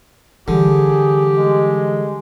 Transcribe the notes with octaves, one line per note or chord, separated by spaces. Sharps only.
D3 E3 G3 G4 G#4
G#3